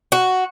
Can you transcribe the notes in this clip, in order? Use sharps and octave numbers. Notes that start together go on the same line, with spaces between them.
F#4